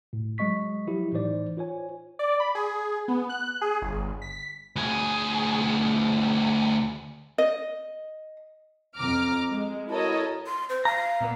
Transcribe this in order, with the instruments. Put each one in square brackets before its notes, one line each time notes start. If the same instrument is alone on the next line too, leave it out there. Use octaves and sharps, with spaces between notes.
[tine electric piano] A2
F#3 G#3 D#5 C#6 B6
F3 F#3 E4 G4
A2 E3 D#4 C5 D5
F4 C5 C#5 G#5
[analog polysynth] D5
B5
G#4
B3
F#6
G#4
G1
B6
[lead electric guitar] D2 G#4
[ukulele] D#5
[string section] F2 A#5 D6 F6
G#3
E4 F#4 A4 A#4 C#5 D#5
[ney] C6
C5
[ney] F5 [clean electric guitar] A#5
[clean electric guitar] A#2 A#3 B3